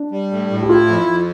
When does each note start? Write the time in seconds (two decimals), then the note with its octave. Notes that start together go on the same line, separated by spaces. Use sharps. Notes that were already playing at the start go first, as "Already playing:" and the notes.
Already playing: D4
0.11 G3
0.31 A2
0.50 A2
0.63 G4
0.69 E4 F4
0.87 F2
1.07 F2